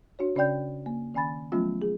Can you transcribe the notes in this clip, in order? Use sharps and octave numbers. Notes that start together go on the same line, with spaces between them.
D4 F#4 C#5
C#3 C#4 D4 D5 G5 G6
A#3
D#3 C#4 G#5 B5 A6
F3 F#3 A3 B3 C#4 F4
G#4